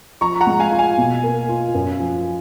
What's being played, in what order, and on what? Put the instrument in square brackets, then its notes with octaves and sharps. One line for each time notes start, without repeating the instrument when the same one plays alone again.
[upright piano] F3 [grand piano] A#5 C#6
[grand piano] F#5 A#5
[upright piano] G#3
[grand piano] F5 G#5
[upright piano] F4
[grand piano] F5 G#5
[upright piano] B2
A#3
F4
F#2
F3